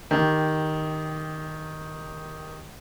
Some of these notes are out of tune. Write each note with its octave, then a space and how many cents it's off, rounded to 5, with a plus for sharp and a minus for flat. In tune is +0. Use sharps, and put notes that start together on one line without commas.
D#3 +0 G4 +0